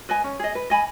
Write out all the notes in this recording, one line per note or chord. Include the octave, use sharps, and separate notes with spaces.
B4 D#5 G#5
C#4
G#4 D#5
B4
D#5 G#5 B5